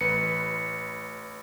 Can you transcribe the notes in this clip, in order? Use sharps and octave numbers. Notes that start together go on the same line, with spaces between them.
A1 B4 B5 C#7